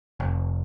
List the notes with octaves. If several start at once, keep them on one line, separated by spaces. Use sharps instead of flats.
F1